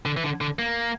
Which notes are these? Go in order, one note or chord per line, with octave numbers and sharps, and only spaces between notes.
D3
E3
D3
D3
A#3